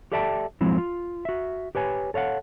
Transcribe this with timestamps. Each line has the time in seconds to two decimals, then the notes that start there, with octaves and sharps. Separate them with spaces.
0.12 G4 A4 D5 E5 G5 A5
0.61 F3 F#3 G#3 C4 E4
0.78 F4
1.25 F#4 E5
1.75 G4 B4 C#5 G#5
2.14 A4 C#5 F5 F#5